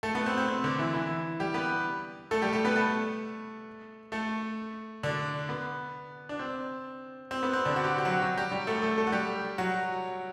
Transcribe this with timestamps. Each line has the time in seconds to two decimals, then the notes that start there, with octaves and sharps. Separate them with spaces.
0.03 A3 A4
0.15 B3
0.26 C4
0.38 C4
0.48 C4
0.64 D3 D4
0.79 E3 E4
0.94 E3 E4
1.40 G3 G4
1.54 B3 B4
2.31 A3 A4
2.42 G3 G4
2.53 A3 A4
2.65 B3 B4
2.76 A3 A4
4.12 A3 A4
5.03 D3 D4
5.49 B3
6.29 D4
6.39 C4
7.31 C4
7.43 B3
7.53 C4
7.65 D3 D4
7.76 F#4
7.84 G4
7.91 F#4
7.98 G4
8.05 F#3 F#4
8.22 F#3 F#4
8.37 G3 G4
8.51 G3 G4
8.67 A3 A4
8.82 A3 A4
8.98 A3 A4
9.07 F#4
9.12 G3 G4
9.58 F#3 F#4